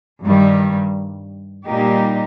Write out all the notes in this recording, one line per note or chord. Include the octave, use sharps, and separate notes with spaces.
G2 D#3 G3
A#2 G3 A#3 D#4 G4